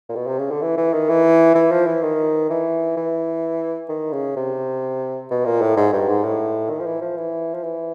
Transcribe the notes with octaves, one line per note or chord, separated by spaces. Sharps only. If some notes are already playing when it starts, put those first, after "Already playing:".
A#2
B2
C3
C#3
D3
E3
E3
D#3
E3
E3
F3
E3
D#3
E3
E3
D#3
C#3
C3
B2
A#2
A2
G#2
G2
G#2
A2
D#3
F3
E3
F3
E3
F3
E3